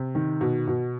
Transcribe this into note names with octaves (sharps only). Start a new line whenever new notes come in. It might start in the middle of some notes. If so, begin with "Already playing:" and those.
Already playing: C3
D#3
B2
B2